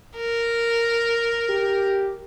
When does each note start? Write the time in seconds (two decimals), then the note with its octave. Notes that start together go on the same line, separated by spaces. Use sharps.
0.17 A#4
1.50 G4